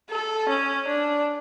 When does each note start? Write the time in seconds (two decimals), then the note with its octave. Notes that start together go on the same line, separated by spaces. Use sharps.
0.10 A4
0.49 C#4
0.88 D4